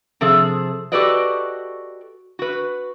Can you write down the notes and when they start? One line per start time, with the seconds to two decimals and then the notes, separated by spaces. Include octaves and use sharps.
0.21 C3 F3 G#4 A4
0.92 F#4 G4 A4 B4 D5 D#5
2.39 F#4 B4